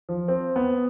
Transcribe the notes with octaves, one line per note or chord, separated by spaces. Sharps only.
F3
C4
B3